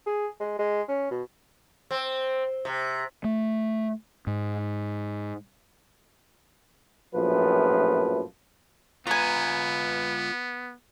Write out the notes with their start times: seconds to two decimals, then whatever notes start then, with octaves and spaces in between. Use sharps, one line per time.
0.06 G#4
0.40 G#3
0.59 G#3
0.88 C#4
1.11 B2
1.91 C4
2.65 C3
3.24 A3
4.27 G#2
7.14 A#1 F#2 A2 F3 B4
9.07 B3 F4 B4 G#5 A#5